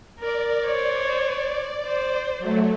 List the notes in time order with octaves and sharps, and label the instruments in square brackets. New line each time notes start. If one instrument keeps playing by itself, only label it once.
[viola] A#4 [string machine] D5
[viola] C5 C#5
C5
[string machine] F#3 A3